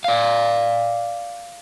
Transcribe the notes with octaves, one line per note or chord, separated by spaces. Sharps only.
D5 F5